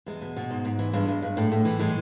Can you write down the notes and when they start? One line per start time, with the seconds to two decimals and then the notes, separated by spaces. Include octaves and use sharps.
0.06 E2 G#3
0.21 B2
0.36 B2
0.51 G#2
0.65 G#2
0.79 E3
0.93 G2 G#3
1.08 G2
1.22 G2
1.37 A2
1.52 A2
1.65 E3
1.79 A2 G#3